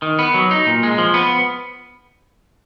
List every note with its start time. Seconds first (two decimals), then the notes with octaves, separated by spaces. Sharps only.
0.02 D#3
0.19 B3
0.34 F#3
0.51 D#4
0.67 A#2
0.83 G#3
0.98 F3
1.14 B3